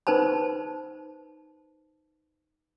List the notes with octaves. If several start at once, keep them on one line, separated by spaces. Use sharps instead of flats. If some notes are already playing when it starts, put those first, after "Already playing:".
D#4 B4 C5 A5 B5